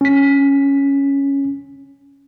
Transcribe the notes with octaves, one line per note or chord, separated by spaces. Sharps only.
C#4 B6